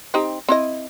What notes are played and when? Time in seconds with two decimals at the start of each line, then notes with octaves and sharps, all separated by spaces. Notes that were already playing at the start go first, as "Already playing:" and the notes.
0.14 C4 D#4 G4
0.49 C4 E4 D#5